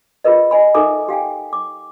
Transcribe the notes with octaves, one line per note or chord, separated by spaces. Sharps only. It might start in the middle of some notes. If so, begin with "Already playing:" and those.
F4 G#4 A#4 B4 D#5
D#5 G#5 B5
D#4 A4 A#4 E5 G#5 D6
G4 F5 G5 G#5
D6